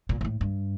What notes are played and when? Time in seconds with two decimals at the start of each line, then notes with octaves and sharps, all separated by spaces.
0.09 A#2
0.21 A#2
0.25 A2
0.41 G2